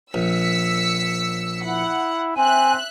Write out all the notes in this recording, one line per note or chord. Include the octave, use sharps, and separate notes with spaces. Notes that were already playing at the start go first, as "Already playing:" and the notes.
A#1 E6 B6 C#7
E4 F#5
C4 E5 G#5 F#6